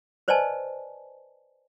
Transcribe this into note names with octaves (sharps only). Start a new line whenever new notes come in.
B4 C5 D5 D#5 G#5 A5